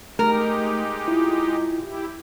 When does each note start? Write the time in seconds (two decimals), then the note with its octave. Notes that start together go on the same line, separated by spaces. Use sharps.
0.19 G#3 A3 D#4 G4 A#4
1.08 E4 F4
1.81 E4 G4